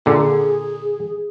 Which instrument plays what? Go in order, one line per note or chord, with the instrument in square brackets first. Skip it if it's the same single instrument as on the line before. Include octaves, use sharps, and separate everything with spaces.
[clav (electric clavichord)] A#2 D3 [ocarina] G#4